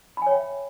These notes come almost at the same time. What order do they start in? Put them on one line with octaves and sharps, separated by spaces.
B5 G#5 C#5 G5 E5